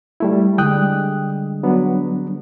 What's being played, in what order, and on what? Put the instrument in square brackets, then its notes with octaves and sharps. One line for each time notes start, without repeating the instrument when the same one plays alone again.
[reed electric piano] G3 A3 E4
[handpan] D3 G3 G#3 [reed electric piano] G5 D#6 F#6
[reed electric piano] F#3 B3 D4